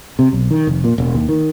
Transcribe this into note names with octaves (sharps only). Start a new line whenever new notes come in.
C3
B1
D#3
F1
A#2
E1
D#2
D#3